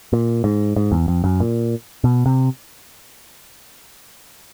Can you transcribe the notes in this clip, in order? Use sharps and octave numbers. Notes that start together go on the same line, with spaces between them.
A#2
G#2
G#2
E2
F2
F#2
A#2
B2
C3